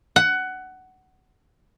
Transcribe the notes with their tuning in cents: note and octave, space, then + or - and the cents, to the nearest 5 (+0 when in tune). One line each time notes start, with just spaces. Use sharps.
F#5 +15